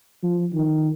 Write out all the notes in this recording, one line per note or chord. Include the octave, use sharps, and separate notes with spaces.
F3
D#3